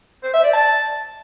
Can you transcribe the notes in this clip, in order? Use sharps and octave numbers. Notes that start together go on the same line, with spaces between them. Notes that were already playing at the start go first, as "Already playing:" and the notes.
C5
E5
D5
A5